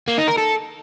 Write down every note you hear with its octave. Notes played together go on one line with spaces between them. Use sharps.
A#3
D#4
A#4
A4